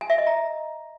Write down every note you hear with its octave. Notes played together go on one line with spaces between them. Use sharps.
G#5
E5
D#5
A#5